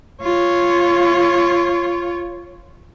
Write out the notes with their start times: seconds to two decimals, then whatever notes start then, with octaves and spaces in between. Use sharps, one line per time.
0.23 F4 C#5